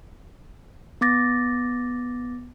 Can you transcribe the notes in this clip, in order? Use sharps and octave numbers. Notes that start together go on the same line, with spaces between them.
B3 D6 A6 A#6